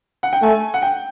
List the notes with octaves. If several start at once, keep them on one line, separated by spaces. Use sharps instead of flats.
F#5
G5
A3 G#5
F#5
G5